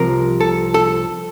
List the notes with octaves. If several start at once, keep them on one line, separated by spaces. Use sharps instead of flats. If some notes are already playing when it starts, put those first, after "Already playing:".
Already playing: C2 C3 F3 A#4
A4
A4